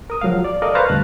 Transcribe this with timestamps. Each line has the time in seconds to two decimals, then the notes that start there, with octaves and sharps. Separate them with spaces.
0.10 A#4 D#6
0.21 F3 F#3 G#3 F5
0.44 D5
0.62 A4 A#4 D5 D#5 F5
0.75 B4 C5 F5 A5 A#5 C#6
0.89 D2 G2 F#6